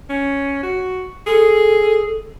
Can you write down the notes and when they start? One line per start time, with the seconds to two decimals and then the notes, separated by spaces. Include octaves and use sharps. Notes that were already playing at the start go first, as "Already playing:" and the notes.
0.10 C#4
0.63 F#4
1.27 G#4 A4